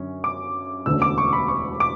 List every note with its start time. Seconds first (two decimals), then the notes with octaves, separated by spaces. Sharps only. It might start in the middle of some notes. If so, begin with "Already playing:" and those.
Already playing: F#2 D3 C#4
0.24 D6
0.86 E1 D2 D3 A3 C#4 E6
1.02 D6
1.18 C#6
1.33 B5
1.48 C#6
1.80 D6